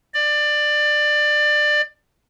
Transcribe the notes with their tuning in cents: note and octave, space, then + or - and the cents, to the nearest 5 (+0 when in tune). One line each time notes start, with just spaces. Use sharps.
D5 +20